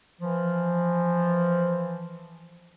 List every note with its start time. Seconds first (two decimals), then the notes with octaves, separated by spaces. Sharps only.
0.19 E3 F3